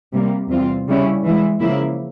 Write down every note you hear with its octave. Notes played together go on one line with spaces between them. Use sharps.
C3 G3 A#3
E2 C3 G3 C4 F4
C#3 G3 C#4 E4
E3 G#3 E4
C#3 F3 A#3 E4